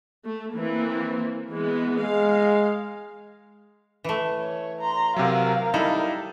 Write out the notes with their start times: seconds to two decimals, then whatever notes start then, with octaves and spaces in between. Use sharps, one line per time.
0.25 A3
0.54 E3 A#3 C4
1.54 E3 G#3 B3
2.01 G#3 F5
4.04 E3 A3
4.40 C#5
4.81 A#5 C6
5.16 C3 F#3 A#4 F5
5.74 G3 D#4 E4 A4